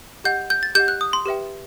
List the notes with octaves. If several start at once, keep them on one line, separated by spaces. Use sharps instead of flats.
G4 D#5 F#5 G6
G6
A6
G4 D#5 F#5 G6
F#6
D#6
C6
G4 B4 E5 G5